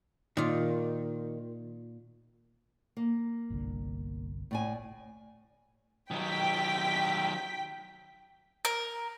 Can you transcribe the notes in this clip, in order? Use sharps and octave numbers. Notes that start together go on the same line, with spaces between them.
A#2 D#3 F4
A#3
G1 C2 D3
A2 D5 G#5
D#3 F#3 G5 B6
A#4